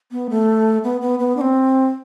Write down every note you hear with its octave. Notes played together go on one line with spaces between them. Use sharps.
B3
A3
B3
B3
B3
D4
C4